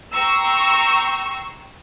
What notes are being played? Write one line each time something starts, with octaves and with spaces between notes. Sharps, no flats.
G5 A#5 C6 C#6 E6